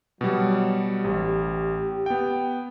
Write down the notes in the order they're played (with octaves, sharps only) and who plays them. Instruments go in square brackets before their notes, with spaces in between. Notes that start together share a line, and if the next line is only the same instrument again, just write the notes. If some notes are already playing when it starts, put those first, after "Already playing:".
[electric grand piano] B2 G3 [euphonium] F#3
[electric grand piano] A1 [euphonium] G4
[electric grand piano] B3 G5